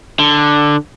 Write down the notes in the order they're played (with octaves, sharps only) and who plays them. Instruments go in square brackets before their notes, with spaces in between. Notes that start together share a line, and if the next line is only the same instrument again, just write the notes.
[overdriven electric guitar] D3